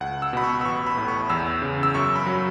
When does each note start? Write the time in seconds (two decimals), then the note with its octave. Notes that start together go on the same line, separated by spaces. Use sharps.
0.01 C#2 F#5
0.22 E6
0.33 B2 B5
0.44 C#6
0.61 E6
0.65 A1 C#6
0.86 B5
0.97 A2
1.08 C#6
1.30 E2 E6
1.62 C#3
1.83 E6
1.94 F#2 C#6
2.16 B5
2.26 F#3